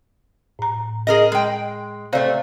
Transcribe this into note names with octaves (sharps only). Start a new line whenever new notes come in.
A2 A#5
G#4 A#4 D#5
G#3 G5
C3 A3 C5 D5 F5